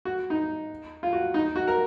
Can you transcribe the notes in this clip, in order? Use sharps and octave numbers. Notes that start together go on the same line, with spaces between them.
F#4
D#4
F4
F#4
D#4
F#4
A#4